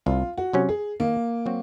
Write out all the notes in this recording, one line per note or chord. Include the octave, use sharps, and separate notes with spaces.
C2 F4
F#4
C3 F#3 C#4
G#4
D#3 A#3
F#3 C4 F#4